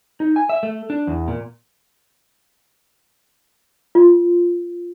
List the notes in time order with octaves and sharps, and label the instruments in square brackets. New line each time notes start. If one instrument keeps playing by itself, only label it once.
[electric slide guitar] D#4
G#5
E5
A3
D4
E2
A#2
[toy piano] F4